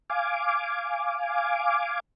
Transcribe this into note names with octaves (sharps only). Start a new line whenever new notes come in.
F5 G#5 D6